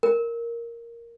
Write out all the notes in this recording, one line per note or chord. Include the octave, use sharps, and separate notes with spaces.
A#4